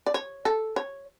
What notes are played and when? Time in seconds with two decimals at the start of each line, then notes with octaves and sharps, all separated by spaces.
0.06 D5
0.14 C#5
0.45 A4
0.76 C#5